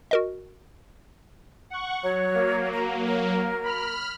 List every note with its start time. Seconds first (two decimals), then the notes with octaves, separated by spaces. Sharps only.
0.11 F#4 A#4 D#5
1.70 F#5 C#6
2.03 F#3 C#5
2.31 F#3 A#3
2.72 A#5
3.05 A#4
3.64 B5 F6